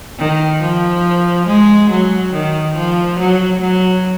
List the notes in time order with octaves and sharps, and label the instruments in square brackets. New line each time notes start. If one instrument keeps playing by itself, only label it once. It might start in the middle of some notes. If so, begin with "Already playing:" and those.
[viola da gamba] D#3
F3
G#3
F#3
D#3
F3
F#3
F#3